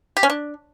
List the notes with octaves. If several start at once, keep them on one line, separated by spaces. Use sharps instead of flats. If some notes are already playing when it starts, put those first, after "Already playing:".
G4
C#4
D4